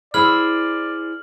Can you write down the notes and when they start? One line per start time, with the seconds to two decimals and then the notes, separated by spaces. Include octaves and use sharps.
0.14 E4 G#4 C5 D5 B5 E6 F6 F#7